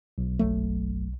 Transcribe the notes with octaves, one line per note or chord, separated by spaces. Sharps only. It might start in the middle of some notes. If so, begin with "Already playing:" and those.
B1
F#1 F#3 A3